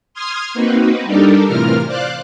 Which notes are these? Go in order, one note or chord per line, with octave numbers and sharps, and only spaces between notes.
C6 D#6 F6 G#6
A#3 C4 D#4 F#4 B4
G3 D4 D#4 G4 A4 A#4
A2 C3 E3 F4 A#4 F6
C5 D5 F5 F#6